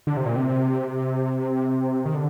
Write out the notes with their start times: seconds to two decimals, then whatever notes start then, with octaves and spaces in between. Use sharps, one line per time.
0.07 D3
0.17 C3
0.26 A#2
0.36 C3
2.05 D#3
2.14 D3